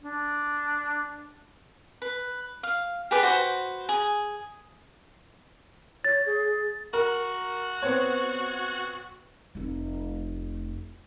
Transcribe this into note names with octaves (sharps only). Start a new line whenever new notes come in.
D4
B4
F5
G4 G#4 B4 D5
F#4 B4 C5
G#4
C#5 A6
G#4
F#4 A#4
B3 C4 C#5
F1 A3